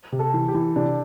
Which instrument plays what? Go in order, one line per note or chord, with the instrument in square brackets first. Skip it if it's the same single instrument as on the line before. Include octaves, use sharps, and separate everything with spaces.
[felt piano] C3
[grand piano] A4
[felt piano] E3
[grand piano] G4
[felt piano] E3
[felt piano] C3 [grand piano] D4